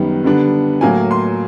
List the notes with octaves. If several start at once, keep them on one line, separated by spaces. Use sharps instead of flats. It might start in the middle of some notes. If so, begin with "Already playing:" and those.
Already playing: F#2 D#3 G3 B3
D3 G3 B3 D4
A2 F#3 A#3 G#5
C6